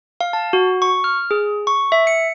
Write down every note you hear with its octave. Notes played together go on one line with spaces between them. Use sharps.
F5
A5
F#4
C#6
F6
G#4
C#6
E5
C#7